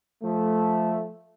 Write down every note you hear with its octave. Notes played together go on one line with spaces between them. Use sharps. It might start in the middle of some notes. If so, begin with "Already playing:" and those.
F3 A3